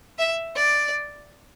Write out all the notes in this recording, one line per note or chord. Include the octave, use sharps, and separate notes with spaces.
E5
D5